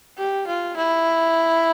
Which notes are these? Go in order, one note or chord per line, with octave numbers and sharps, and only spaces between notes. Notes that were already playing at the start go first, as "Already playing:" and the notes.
G4
F4
E4